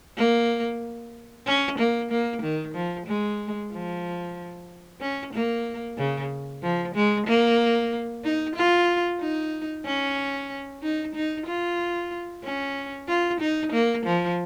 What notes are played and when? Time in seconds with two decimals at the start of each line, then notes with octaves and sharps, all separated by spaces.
0.17 A#3
1.46 C#4
1.79 A#3
2.11 A#3
2.42 D#3
2.74 F3
3.07 G#3
3.72 F3
5.00 C#4
5.33 A#3
5.98 C#3
6.62 F3
6.95 G#3
7.27 A#3
8.24 D#4
8.56 F4
9.20 D#4
9.85 C#4
10.83 D#4
11.15 D#4
11.47 F4
12.44 C#4
13.08 F4
13.41 D#4
13.72 A#3
14.06 F3